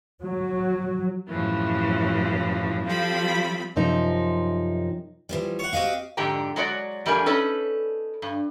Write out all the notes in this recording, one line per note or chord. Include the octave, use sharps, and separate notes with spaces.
F#3
F#2 A2 C3 E3 F3
F3 G3 C4 F4 A4 B5
F#2 C3 F3 D#4
E3 F3 G3
C#5 F#5
C4 F#4 G4 D#5 F5
F2 G#2 D3 D4 G4 A#5
F#3 G#3 A3 F#4 D5
F2 G3 A3 D4 A#4 G#5
C#4 D#4 A4 B4
G2